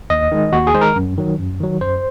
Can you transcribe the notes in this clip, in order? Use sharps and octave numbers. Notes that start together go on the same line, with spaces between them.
D#2 D#5
D#3 G#3
D#2 F#4
G#4
D#3 G#3 C5
A#4
F#2
D#3 F#3
F#2
D#3 F#3
F#2 C5